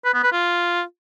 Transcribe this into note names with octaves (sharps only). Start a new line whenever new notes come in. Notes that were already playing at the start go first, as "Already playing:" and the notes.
B4
B3
B4
F4